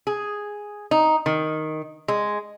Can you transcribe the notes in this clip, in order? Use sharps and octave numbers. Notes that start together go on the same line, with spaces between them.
G#4
D#4
D#3
G#3